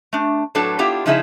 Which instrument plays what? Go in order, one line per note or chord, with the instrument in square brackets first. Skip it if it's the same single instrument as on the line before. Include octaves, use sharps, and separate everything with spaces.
[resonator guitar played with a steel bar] A3 D4
A2 F#3 D4 A4 B4 A5
B3 D4 E4 F4 G4 G5
C#3 F3 D#4 E4 G#4 E5